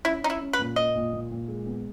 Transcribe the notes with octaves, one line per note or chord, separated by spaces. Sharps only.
C#4 E4
C#4 D#4
E4
C#4
B4
A#2
A#3 D#5
A#2
A#2
A#2
G#3
B3